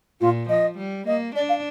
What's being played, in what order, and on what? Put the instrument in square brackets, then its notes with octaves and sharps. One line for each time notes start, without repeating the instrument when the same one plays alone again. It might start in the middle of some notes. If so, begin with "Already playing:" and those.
[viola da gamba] A#2 [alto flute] F4
[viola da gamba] F3 [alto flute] D#5
[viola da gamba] G3
[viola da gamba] A#3 [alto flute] D#5
[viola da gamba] D4 [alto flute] D5
[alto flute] F5